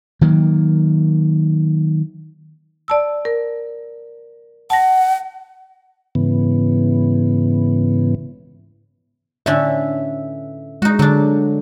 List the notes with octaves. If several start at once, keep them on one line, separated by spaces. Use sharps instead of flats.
D#3 F#3 A#3
D5 A5 E6
A#4
F#5 A5 A#6
G#2 C#3 E3 B3
A2 D3 C#4 E5
G#3 D#4 F#4
D3 F#3 D4